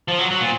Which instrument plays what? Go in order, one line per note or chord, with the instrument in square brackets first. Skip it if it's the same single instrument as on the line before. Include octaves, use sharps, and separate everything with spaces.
[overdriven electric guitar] F3
F#3
F#3
A#2